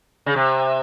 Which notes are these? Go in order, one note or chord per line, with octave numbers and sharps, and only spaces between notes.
C#3
C3